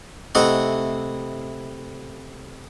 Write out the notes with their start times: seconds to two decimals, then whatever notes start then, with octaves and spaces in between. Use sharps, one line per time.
0.35 C3 A3 E4 D#5 F#5 A#5